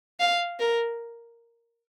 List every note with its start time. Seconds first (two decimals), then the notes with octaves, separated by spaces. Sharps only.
0.20 F5
0.60 A#4